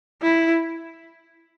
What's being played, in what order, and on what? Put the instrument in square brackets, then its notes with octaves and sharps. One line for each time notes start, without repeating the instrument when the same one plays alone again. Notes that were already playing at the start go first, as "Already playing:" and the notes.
[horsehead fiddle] E4